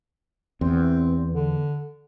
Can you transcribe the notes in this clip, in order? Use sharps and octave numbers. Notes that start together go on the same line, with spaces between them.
E2 C4
D3